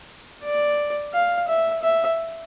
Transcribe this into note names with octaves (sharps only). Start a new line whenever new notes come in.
D5
F5
E5
E5